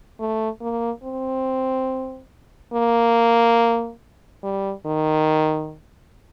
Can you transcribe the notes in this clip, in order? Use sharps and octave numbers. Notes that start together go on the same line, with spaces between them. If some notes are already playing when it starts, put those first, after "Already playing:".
A3
A#3
C4
A#3
G3
D#3